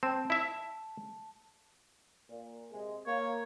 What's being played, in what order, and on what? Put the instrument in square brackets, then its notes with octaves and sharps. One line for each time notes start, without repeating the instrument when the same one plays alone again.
[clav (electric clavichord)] C4 [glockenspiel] A5
[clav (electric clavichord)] E4 E5
[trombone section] A#2
C3 G#3
[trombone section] A#3 [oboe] C#5